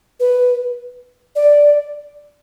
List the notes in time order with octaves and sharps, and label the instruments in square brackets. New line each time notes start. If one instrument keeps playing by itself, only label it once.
[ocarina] B4
D5